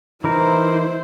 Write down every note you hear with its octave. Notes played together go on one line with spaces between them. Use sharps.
E3 D#4 E4 A#4 C5